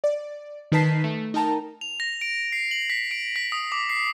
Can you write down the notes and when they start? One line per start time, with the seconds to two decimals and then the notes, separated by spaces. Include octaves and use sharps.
0.04 D5
0.72 D#3 D#4 B4 A5 B6 C7
1.04 A3
1.34 D#4 A#4 G5 A5 A#5
1.81 F7
2.00 A#6
2.21 D7
2.52 C7
2.71 F#7
2.90 B6
3.11 D7
3.36 B6
3.52 D#6
3.72 D6
3.89 C7